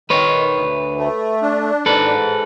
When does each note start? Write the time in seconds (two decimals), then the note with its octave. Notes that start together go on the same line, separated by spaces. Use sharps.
0.10 D#3 B4 C#5
0.54 D2
0.98 A3
1.42 D4
1.86 G#2 A4 B4